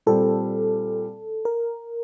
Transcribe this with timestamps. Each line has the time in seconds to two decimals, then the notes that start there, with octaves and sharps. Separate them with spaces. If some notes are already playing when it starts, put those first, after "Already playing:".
0.06 A#2 G3 C4 A4
1.45 A#4